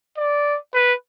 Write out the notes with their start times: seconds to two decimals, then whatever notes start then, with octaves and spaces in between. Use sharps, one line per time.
0.17 D5
0.74 B4